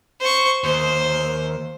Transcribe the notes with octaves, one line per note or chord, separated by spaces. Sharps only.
C5 C#6
D#2 C5